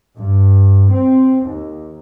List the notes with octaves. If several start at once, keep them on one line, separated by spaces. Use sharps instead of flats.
G2
C4
D#2